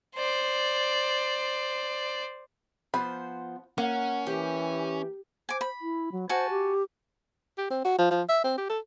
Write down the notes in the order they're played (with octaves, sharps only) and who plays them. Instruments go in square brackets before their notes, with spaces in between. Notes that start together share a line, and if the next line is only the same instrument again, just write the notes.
[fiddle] C5 D5
[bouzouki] F3 B3 C5 [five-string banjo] B5
[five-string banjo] A#3 [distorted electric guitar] C#4 [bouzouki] F#5
[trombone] E3 [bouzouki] G4
[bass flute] C5 [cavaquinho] G#5 D6
[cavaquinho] B5
[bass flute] E4
F#3
[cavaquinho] F#4 G#5 A5 [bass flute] C5
[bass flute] G4
[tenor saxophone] G4
C4
F#4
F3
F3
E5
C4
G4
A4